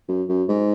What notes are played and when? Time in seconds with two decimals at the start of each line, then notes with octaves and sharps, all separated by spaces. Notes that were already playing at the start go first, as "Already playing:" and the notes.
0.08 F#2
0.29 F#2
0.49 G#2